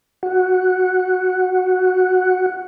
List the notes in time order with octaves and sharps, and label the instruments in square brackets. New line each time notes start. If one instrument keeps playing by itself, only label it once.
[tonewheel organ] F#4 F#5